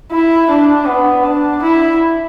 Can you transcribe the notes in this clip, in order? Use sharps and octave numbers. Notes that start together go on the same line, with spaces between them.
E4
D4
B3
D4
E4